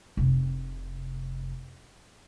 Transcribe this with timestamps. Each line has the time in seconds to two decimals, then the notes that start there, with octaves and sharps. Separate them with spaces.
0.17 F1 C3